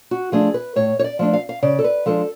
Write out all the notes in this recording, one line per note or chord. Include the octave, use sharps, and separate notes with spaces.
F#4
F3 A3 D4 G#4
B4
A2 C#5
C#5
D5
F3 A3 D4
F5
F5
C#3 D5
A4
B4
F3 G#3 D4 A4